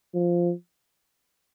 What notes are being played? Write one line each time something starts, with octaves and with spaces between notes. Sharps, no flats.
F3